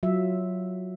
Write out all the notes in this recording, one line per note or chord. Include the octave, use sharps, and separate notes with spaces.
F#3 F4 E5